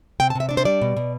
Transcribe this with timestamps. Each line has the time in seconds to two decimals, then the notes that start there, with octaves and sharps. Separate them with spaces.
0.20 C3 G5
0.30 A5
0.35 C3 E5
0.49 D4 D5
0.57 C5
0.65 G3 D5
0.82 B2
0.96 B2